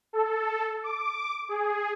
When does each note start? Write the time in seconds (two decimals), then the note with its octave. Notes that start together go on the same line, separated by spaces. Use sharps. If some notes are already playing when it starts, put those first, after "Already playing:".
0.13 A4
0.84 D6
1.49 G#4